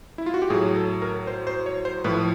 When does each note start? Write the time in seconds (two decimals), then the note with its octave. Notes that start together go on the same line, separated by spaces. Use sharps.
0.18 E4
0.26 F4
0.34 F#4
0.42 G4
0.50 A2 F#3 G#4
0.76 A4
1.02 A#4
1.27 C5
1.47 C5
1.66 C#5
1.85 C5
2.04 A2 F3 B4